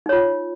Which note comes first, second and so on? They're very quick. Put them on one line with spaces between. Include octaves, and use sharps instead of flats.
D#4 C#5 F4